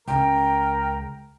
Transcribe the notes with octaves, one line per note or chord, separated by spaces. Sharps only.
C#2 C#3 A#4 G5